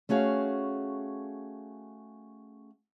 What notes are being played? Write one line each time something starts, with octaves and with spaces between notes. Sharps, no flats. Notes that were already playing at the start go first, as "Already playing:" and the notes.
A3 C#4 F#4 G#4 F5